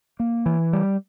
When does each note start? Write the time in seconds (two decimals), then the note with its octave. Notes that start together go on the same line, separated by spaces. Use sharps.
0.20 A#3
0.46 E3
0.73 G3